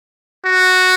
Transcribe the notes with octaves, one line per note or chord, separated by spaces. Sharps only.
F#4